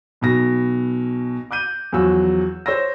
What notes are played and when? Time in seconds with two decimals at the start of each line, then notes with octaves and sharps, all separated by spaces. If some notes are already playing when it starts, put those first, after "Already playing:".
0.21 B1 B2 A#6
1.51 D6 F#6 G6 D#7
1.92 E2 F3 F#3 F#4 E6
2.66 C5 C#5 E6 A#6